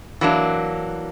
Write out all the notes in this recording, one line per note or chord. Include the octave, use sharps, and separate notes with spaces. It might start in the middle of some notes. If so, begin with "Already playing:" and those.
E3 F#3 A#3 D4